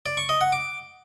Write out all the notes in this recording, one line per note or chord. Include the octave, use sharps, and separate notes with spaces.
D5
C#6
D#5
F#5
D6